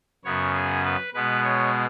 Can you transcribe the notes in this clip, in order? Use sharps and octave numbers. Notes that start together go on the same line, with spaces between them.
F#2 C#3 B3 C#5
G#4
B4
B2 G#3 B3 B4
C#5